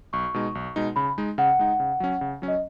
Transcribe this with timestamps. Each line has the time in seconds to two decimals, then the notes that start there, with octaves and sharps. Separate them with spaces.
0.13 B1 C#6
0.34 B2 G#3 D#4
0.55 B1
0.76 B2 G#3 D#4
0.96 C#3 B5
1.18 G#3 D#4
1.38 C#3 F#5
1.59 G#3 D#4
1.80 C#3
2.00 F#3 C#4
2.21 C#3
2.42 F#3 C#4
2.48 D#5